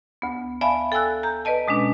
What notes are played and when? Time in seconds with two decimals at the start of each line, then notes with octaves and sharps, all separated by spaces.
0.22 D2 B3
0.61 D5 E5 F5 G#5 A5 B5
0.92 A4 G5 G#5 E6 F#6
1.23 A#5 G6
1.45 B4 D5 D#5 A5
1.68 B2 G#3 C#4 D4